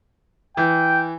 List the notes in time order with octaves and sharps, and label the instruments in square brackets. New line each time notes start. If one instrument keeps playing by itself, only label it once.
[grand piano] E3 [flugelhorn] G5